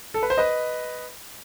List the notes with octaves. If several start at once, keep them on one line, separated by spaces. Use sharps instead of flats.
A4
B4
C5
B4 D#5